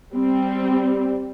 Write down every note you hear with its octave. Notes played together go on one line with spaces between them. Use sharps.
G3 C4